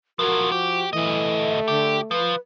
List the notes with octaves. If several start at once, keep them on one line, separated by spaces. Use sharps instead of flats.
F3 F#3 F#4 A#4
F3 G4
D2 E3 A3 D#5
D3 G4
F3 B4